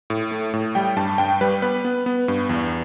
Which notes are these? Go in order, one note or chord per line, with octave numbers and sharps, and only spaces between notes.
A2
A3
A2
G3 G5
G2 A5
G2 G5
G3 B4
B3 B4
B3
B3
G2
E2